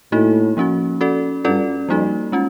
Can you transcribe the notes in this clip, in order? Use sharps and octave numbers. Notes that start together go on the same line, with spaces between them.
A2 A#3 D#4 F#4
F3 A#3 C#4 F#4
C#4 F#4 A4 D5
G2 C#4 F4 A4 D5
F2 G3 A#3 D#4 F#4
G#3 C#4 F4